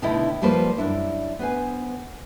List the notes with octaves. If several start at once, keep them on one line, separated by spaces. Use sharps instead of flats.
B2 D3 D#3 A3 D#4 E4
F3 G3 A#3 B4 C5
F#2 D4 E4
B3 B4 C5 G#5